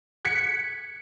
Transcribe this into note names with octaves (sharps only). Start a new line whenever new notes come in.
F#6 G#6 B6 C#7